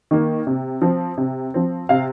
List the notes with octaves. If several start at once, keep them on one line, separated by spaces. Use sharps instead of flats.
D#3 A#3
C3
F3 C4
C3
F3 C4
C3 F5